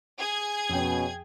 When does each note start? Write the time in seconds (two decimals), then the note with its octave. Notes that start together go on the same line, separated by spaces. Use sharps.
0.18 G#4 G#6
0.70 F2 B2 C#4 G5